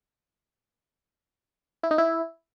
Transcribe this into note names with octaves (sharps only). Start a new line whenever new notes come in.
E4
D#4
E4